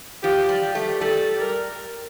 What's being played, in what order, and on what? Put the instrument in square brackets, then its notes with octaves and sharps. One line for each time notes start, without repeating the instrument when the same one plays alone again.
[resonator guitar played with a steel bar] F3 [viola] G4
[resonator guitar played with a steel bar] G3
[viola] G4
[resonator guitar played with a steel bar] A3
[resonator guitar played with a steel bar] G3 [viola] A4
[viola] A#4